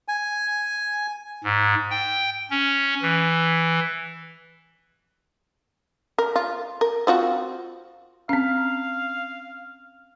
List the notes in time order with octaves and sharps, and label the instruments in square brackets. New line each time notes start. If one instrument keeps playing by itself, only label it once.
[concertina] G#5
[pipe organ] G#2
G5
C#4
E3
[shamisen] A#4
F4
A#4
C4 F4 F#4
[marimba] C4 C#4 [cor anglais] F5